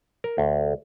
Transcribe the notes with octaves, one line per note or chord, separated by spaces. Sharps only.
A#4
D2